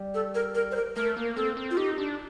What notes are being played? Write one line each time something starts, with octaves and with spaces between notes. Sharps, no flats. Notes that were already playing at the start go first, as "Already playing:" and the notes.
Already playing: G3
A4
A#4
A#4
C5
A#4
A3 A#4
A#3
C4 A4
C4
F4
D#4 G4
D4